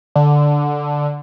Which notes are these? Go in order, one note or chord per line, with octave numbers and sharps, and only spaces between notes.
D3